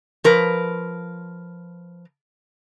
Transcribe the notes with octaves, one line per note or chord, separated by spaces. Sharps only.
F3 A#4 B4